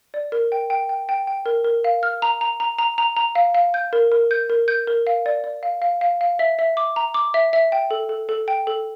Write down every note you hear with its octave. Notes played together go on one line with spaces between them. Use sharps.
D5
A#4
G5
G5
G5
G5
G5
A#4
A#4
F5
F6
A#5
A#5
A#5
A#5
A#5
A#5
F5
F5
G6
A#4
A#4
G6
A#4
G6
A#4
F5
D5
D5
F5
F5
F5
F5
E5
E5
D6
A#5
D6
E5
E5
G5
A4
A4
A4
G5
A4